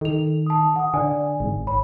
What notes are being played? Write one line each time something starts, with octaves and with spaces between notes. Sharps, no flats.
D#3 A4 F7
A5 D#6
F#5 D#6
D3 D5 G#5
G#1
C#5 B5